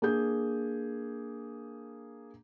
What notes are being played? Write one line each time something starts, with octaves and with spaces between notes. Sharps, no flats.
A#3 D4 G#4 G6